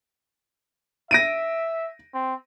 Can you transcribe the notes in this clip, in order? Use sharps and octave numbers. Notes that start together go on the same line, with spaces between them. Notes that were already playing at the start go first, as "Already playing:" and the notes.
E5 A#6 D7 D#7
C4